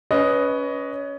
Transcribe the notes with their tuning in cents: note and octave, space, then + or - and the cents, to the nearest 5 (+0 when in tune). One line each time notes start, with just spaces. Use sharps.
C#4 +20 B4 +0 D#5 +0